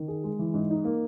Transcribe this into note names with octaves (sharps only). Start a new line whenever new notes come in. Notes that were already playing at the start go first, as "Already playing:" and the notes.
Already playing: D#3
G#4
G#3
E3
G#2
D#4
A#3